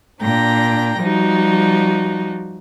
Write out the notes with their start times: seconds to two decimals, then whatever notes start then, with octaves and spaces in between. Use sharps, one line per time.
0.21 A#2 D4 G5 A#5 A#6
1.00 F3 G3 D#4 F#4